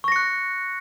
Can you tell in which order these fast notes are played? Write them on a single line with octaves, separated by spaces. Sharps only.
C#6 A#6 C#7 F#6